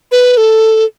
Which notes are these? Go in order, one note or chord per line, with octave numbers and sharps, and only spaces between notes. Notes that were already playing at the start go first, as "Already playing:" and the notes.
B4
A4